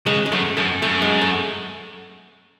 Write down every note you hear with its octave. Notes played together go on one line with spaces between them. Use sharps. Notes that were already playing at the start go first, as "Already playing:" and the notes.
C#3 G#3
G#3
F#2 A3
F#2 A3
F#2 A3
G#3
A3